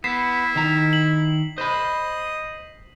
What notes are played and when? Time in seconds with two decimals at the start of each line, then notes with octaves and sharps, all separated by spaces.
0.04 B3 E4 B6 C7 E7
0.55 D#3 A#5
0.93 F#7
1.58 C5 D#5 B5